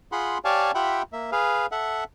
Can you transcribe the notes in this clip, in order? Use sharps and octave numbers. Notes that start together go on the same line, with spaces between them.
F4 G#4 F#5 B5 C6
G4 C#5 D5 F5 G#5 A5
F4 G4 E5 F#5 G5 B5
A#3 E5
G#4 B4 F5
A4 E5 F#5